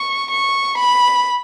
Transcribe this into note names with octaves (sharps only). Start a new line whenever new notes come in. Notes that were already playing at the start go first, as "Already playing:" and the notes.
Already playing: C#6
C#6
B5